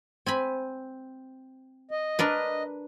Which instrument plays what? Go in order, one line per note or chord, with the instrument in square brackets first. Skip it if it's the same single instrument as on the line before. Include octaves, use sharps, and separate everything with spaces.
[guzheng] C4 G#5 B5
[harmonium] D#5
[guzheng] D4 A#4 B4